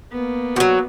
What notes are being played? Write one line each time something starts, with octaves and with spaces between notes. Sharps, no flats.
A#3 B3
F3 F#3 F#4